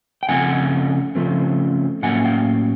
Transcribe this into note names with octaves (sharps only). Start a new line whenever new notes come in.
G5
C#3 F3 A3 C4 F#5 G#5
C#3 F3 A3 C4
A2 F#3 A#3 C#4 F#5 G#5
F5 G5